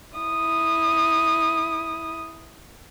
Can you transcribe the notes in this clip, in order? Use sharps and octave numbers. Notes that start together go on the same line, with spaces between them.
E4 D#6